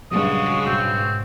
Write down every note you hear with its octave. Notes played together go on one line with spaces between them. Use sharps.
A#1 G2 C#3 F#3 G#3 F#4 D#6
B1 G#2 C4